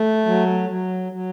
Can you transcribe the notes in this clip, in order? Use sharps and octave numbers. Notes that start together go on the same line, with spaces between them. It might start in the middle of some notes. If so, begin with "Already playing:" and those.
Already playing: A3
F#3
F#3
F#3